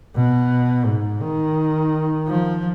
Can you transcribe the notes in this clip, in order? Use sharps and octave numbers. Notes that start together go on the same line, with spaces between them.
B2
G#2
D#3
F3